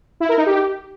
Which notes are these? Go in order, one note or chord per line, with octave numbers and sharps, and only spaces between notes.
E4
A#4
D#4
G4